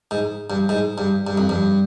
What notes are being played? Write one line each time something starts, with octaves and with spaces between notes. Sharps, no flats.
G#2
G2
G#2
G2
G2
F2
G2